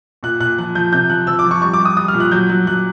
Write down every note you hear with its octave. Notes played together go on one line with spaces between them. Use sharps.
A#2 F#6
A#2 F#6
F3 F#6
F3 G6
C3 G6
F3 F#6
F3 E6
D6
F3
C#6
G3 C#6
D6
G3
D#6
G3 D#6
F6
A#2
F#6
F#3 G6
F#3 F#6
F#3 F#6